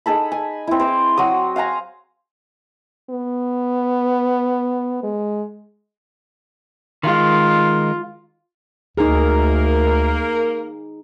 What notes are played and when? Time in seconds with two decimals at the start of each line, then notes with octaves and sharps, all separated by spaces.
0.06 D#4 G#4 A4 B5
0.32 G#5
0.67 C4 E4
0.80 C5 A#5 D6
1.17 F#3 F#4 D#6
1.56 F5 F#5 G#5 A#5
3.10 B3
5.03 G#3
7.03 D#3 G#3 F4
8.97 D2 A#3 D#4 G#4 A#4